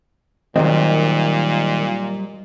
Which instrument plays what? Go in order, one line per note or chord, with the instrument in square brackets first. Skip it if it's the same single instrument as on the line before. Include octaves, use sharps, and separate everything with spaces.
[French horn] A#2 [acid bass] D#3 [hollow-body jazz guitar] F#3 G3 C4 [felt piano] D#5